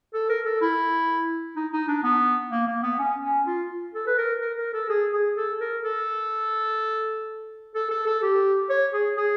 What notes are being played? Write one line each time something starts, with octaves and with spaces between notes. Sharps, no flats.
A4
A#4
A4
E4
D#4
D#4
D4
B3
A#3
A#3
B3
C#4
C#4
F4
A4
B4
A#4
A#4
A#4
A4
G#4
G#4
A4
A#4
A4
A4
A4
A4
G4
C#5
G#4
G#4